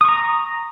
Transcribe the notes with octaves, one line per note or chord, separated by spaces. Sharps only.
A#5 C#6 D#6